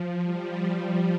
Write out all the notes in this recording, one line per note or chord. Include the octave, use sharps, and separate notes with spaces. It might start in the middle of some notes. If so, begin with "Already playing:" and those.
Already playing: F3
G3